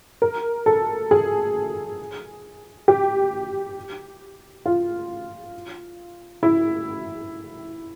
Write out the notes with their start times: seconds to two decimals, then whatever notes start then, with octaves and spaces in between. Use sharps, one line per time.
0.22 A#4
0.66 A4
1.11 G#4
2.88 G4
4.66 F4
6.43 E4